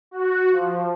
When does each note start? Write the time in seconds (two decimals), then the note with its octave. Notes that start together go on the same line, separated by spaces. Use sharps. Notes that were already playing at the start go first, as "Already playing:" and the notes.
0.11 F#4
0.51 F3